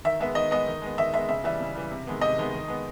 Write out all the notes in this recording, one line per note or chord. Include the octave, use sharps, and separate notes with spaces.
D#3 E5
G#3 B3 E5
D#3 D#5
G#3 B3 D#5
D#3
G#3 B3
D#3 E5
G#3 B3 E5
C#3 E5
E3 G3 E5
C#3
E3 G3
C3
D#3 G#3 B3
C3 D#5
D#3 G#3 B3
D#3
G#3 B3